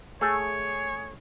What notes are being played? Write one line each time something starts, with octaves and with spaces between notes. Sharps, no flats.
A3 G#4 C#5